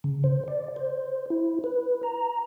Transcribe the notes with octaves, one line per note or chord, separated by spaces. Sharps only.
C#3
C5
D5
C5
E4
B4
A#5